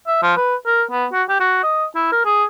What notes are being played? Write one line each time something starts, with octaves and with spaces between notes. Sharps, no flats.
E5
F3
B4
A#4
B3
F#4
G4
F#4
D#5
E4
A#4
G#4